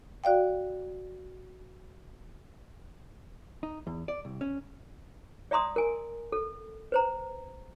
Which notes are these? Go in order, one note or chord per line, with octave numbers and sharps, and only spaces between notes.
F#4 D5 F5 G5
D#4
E2
D5
C2
C#4
D5 E5 A#5 C6 D#6
A#4 G#5
A4
B4 C5 A#5